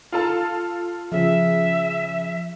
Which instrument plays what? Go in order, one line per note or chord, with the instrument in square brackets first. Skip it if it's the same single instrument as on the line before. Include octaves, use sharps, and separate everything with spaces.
[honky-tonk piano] F4 A4 A5
[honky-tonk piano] C#3 [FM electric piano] F3 [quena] E5